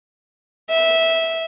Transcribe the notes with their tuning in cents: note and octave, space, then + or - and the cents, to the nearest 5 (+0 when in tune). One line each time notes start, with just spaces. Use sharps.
E5 -15